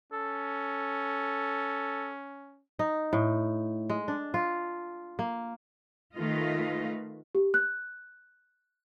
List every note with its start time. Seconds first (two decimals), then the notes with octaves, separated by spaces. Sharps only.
0.12 C#4 A4
2.79 D#4
3.13 A2
3.89 G#3
4.08 D4
4.34 F4
5.19 A#3
6.14 D#3 A3 F4 B4 D#5 F5
7.35 G4
7.54 F#6